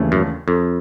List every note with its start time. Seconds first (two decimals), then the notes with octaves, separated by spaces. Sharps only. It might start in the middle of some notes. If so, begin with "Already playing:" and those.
Already playing: D#2 C#3 E3 A3 D4
0.12 F#2
0.48 F2